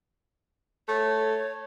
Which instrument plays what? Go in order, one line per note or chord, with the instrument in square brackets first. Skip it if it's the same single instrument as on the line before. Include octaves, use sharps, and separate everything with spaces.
[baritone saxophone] A3 [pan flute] C#5